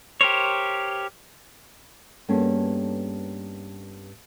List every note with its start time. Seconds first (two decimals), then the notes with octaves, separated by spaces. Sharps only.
0.21 G4 A#4 C5 C#5
2.29 G2 A#3 B3 C#4 G#4 A4